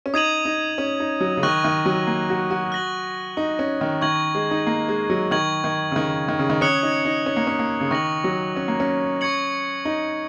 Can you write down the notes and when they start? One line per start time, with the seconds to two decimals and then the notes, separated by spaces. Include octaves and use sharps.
0.06 C#4
0.14 D#4 D#6 G#6 D#7 F#7
0.45 D#4
0.78 C#4
1.00 D#4
1.21 F#3
1.37 C#3
1.43 D#3 C#6 F#6 A#6 F#7
1.64 D#3
1.86 F#3
2.07 A#3
2.30 F#4
2.51 F#4
2.72 F#6 A#6 F#7
3.37 D#4
3.59 C#4
3.81 D#3
4.02 D#3 C#6 G#6 F#7
4.35 G#3
4.51 D#4
4.67 A#3
4.88 G#3
5.10 F#3
5.31 D#3 C#6 G#6 F#7
5.64 D#3
5.92 C#3
5.96 D#3
6.29 D#3
6.39 C#3
6.50 D#3
6.61 C#4 D#6 F#6 C#7 F#7
6.83 D#4
7.05 D#4
7.26 C#4
7.36 A#3
7.47 C#4
7.59 A#3
7.81 C#3
7.91 D#3 C#6 A#6 F#7
8.24 F#3
8.56 C#4
8.68 A#3
8.80 C#4
9.21 C#6 G#6 C#7 F#7
9.85 D#4